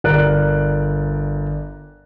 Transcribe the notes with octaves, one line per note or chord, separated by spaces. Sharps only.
G1 A#4 D5 F#6 A6 D7